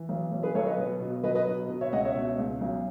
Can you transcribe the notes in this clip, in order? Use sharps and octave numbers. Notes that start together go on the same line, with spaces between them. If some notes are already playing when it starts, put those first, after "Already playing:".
Already playing: E3
B1
B1
G#4 B4
B1 A4 C#5
B4 D#5
B2
B2
F#3 B4 D#5
B4 D#5
B2
B2
C#5 E5
C#2 D#5 F#5
C#5 E5
B2
C#2
B1